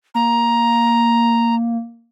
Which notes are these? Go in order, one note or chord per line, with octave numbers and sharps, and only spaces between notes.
A#3 A#5